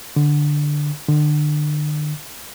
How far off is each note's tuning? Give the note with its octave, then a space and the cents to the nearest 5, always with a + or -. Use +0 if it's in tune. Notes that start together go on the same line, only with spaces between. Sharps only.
D3 +5
D3 +35